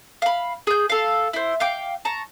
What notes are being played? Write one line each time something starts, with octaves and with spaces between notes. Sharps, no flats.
F5 B5
G#4 G6
A4 F5
E4 C5
F5 G5 D6
A5 A#5 C#6